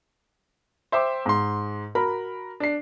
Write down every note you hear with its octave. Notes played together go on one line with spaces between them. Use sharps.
C5 E5 G5 C6 D6
G#2 C6
F#4 A#4 A#5 B5
D4 C7